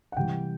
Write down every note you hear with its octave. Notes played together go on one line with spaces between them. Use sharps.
F#5
C3 E3 G3 G5